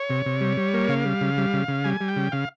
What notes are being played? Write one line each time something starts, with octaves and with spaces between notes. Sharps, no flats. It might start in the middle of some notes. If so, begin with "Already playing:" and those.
Already playing: C#5
C3
C3
G3
G3
A#3
C#3 F5
G3
C#3
G3
C#3
C#3
G3 G#5
G3
G5
C#3
C#3 F5